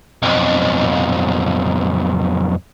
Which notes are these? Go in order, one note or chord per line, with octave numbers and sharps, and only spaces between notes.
B1 F2